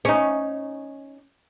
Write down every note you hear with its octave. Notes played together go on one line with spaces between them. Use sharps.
C#4 D#4